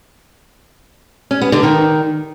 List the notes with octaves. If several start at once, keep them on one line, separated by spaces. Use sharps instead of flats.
C#4
B3
D3
D#3